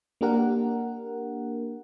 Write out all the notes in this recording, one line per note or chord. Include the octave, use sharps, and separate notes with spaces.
A#3 D4 G4 A#4 F#5